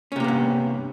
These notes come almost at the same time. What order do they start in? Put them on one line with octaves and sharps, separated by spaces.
C#4 C3 A#3 B3 G2